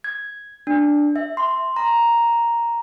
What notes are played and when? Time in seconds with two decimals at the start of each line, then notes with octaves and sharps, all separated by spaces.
0.04 G#6
0.67 D4
1.16 E5
1.37 C6
1.76 A#5